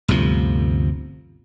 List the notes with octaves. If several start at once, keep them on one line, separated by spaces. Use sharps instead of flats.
G1 D2 C3 F3